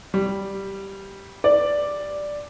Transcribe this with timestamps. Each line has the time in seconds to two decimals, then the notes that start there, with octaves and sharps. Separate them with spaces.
0.14 G3
1.44 D5